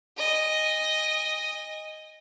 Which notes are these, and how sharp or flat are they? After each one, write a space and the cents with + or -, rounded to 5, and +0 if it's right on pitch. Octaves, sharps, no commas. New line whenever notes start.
D#5 +0 G#5 -30